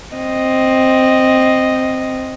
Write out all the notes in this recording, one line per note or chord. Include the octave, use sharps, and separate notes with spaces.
C4 D#5